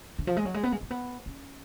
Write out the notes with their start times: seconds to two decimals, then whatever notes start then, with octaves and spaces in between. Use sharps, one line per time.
0.19 D3
0.27 F3
0.36 G#3
0.45 F#3
0.54 G#3
0.63 B3
0.72 G#3
0.81 A3
0.90 B3
1.26 C#4